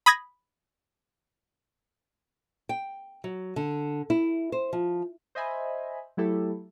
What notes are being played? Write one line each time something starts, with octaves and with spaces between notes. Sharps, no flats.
B5 D#6 G#6 A#6
G5
F#3
D3
E4
C5
F3
C5 D#5 E5 G#5 B5
F#3 A3 E4 G4 A4